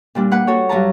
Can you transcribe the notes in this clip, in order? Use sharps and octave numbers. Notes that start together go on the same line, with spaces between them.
A#2 G3 D4
A#3 B4 F#5
F#4 A4 C#5
G2 F#3 B4 A5 A#5